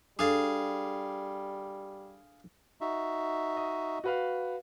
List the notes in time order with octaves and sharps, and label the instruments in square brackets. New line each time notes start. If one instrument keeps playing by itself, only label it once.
[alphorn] G3 [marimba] D4 A4 [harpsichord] G#4 F5
[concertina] D#4 F#4 E5
[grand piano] D#5
F#4 B4 F5